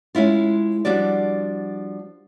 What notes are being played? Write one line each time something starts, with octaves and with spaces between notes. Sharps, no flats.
G#3 C#4 E4 F4
F3 G3 D4 F#4 D5